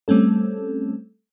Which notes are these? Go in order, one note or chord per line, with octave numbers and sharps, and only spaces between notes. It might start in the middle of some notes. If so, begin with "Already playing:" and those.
G3 A3 C4 C#4 A4